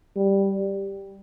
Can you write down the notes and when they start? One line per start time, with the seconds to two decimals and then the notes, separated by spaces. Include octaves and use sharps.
0.17 G3